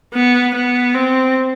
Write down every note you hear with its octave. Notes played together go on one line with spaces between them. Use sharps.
B3
B3
C4